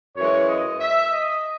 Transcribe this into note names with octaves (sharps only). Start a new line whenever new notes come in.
F#2 E3 G#3 C#5
D#5
E5
D#5